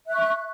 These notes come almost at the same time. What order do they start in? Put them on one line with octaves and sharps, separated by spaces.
E5 F#6 C#6